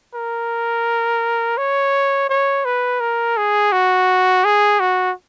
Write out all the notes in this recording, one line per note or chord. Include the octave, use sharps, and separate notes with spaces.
A#4
C#5
C#5
B4
A#4
G#4
F#4
G#4
F#4